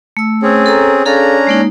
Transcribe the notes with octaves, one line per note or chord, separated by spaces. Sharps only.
A3 E6
C4 C#4 G#4
A4 A#5
C#4 D4 G#4 A4 F5 A#5
G#3 A#3 D#4